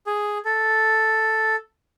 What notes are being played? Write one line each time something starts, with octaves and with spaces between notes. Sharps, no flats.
G#4
A4